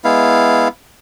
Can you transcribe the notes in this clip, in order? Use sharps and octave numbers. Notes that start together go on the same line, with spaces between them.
G#3 B3 E4 F5